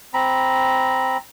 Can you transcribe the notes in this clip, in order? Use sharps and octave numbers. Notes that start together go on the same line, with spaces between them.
C4 A#5 B5